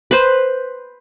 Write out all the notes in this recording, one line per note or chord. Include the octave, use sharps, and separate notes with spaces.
B4 C5